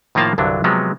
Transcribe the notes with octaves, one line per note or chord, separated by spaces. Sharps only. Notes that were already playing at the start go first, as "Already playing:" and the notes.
A2 D#3 F3 A#3 F4 A5
C2 G2 D3 F#3 D4
C3 F3 F#3 G#3 B3